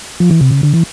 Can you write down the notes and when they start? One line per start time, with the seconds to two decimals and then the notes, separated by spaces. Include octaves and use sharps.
0.20 F3
0.31 E3
0.41 C3
0.52 C#3
0.63 D3
0.74 E3